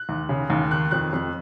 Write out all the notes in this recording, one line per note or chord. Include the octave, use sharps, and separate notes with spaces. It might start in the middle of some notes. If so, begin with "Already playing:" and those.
Already playing: F#6
D#2
C#3
D#2
D#3 F#6
F2 F#6
F2